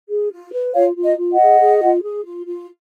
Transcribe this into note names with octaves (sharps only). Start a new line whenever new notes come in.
G#4
F4
B4
F4 C#5 F5
F4
D#5
F4
D#5 F#5
G#4
G#4
F4
G#4
F4
F4